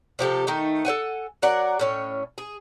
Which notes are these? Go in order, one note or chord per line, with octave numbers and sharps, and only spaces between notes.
C3 F3 G4 A4
D#3 A3 D#4
A4 C5 F#5 G#5
F#3 A#4 D5 F#5
A2 C#4 C#5
G#4